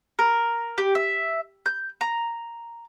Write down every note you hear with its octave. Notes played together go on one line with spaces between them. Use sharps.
A#4
G4
E5
G6
A#5